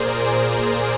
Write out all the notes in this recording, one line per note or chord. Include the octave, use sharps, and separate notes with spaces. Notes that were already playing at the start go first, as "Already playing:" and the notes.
Already playing: A#2 G#4 A#4 C5 D5